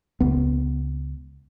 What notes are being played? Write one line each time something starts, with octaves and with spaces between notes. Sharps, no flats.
C#2 B3